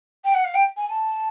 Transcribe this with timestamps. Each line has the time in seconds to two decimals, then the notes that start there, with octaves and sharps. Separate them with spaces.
0.25 G5
0.34 F#5
0.45 F5
0.55 G5
0.77 G#5
0.90 A5